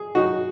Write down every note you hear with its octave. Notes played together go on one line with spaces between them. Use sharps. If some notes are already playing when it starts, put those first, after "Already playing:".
Already playing: G#4
D#4 F#4